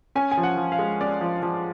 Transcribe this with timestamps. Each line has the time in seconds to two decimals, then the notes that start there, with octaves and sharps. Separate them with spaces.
0.15 C#4 G#5
0.32 G#5
0.37 F3
0.43 F#5
0.57 F3
0.72 F5
0.79 G#3
1.01 C#4 D5
1.21 F3
1.43 F3